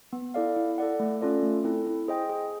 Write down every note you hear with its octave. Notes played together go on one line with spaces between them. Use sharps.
B3
E4 A4 D5 F5
E4
A4 D5 F#5
A3
C#4 F4 A4 D5
A3
C4 E4 A4
E4
G#4 C5 D#5 G5
G#4